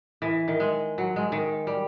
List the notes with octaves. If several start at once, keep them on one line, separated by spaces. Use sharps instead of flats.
E3
D#3
G#3
F#3
G#3
D#3
G3